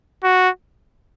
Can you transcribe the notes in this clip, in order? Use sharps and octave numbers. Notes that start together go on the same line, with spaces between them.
F#4